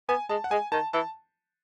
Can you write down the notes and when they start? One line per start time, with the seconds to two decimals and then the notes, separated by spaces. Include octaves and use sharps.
0.08 B3 G#5
0.29 G#3 A5
0.44 F#5
0.51 G#3 G#5
0.72 D#3 A5
0.93 E3 A5